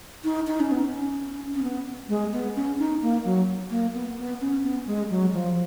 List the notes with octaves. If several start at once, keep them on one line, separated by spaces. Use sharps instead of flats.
D#4
D#4
C#4
B3
C#4
C#4
B3
G#3
B3
C#4
D#4
A#3
F#3
A#3
B3
B3
C#4
B3
G#3
F#3
F3